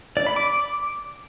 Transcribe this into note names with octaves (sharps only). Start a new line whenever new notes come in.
D5
B5
D6